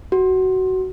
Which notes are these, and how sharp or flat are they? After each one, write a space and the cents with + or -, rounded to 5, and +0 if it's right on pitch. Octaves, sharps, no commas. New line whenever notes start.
F#4 +15